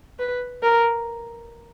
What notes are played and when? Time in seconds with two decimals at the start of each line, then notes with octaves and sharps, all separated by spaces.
0.19 B4
0.63 A#4